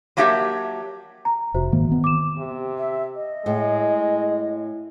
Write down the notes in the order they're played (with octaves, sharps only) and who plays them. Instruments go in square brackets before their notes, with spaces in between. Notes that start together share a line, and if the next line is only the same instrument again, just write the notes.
[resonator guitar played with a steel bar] F#3 A#3 D4 G4 E5
[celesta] A#5
[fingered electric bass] F1 [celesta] F#4 C5 E5
[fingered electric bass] G#2 D#3 A#3
D#3 B3
[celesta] D6 E7
[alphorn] C3
[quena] E5
D#5
[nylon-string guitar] A2 [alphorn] G#3